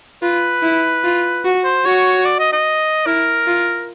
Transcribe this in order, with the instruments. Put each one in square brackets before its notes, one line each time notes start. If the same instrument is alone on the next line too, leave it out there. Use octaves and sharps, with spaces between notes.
[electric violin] F4 [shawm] B4
[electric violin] E4
F4
F#4
[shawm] C5
[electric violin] F#4 [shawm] C#5
[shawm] D5
D#5
D#5
[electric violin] E4 [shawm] A#4
[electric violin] F4